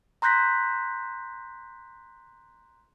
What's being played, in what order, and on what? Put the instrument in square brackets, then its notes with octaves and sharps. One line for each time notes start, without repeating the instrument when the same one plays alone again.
[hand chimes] A#5 C6 F#6 G6 A#6 B6